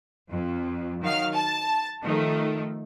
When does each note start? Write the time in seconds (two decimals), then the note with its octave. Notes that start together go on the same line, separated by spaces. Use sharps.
0.29 F2
1.02 D#3 F#3 F5 F6
1.34 A5
2.02 D#3 F3 A3